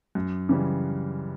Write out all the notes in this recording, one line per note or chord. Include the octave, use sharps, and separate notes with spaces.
F#2
C#3 E3 G3